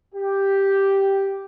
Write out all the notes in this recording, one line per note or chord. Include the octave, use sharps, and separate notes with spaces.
G4